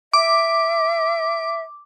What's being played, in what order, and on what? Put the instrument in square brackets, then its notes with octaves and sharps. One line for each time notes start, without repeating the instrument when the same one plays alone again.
[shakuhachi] E5 [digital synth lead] D6